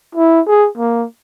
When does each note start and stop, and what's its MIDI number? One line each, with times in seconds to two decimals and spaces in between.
0.15 0.41 64
0.48 0.69 68
0.78 1.06 58